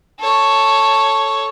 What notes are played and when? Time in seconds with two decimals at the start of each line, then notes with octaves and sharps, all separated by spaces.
0.20 A4 C#5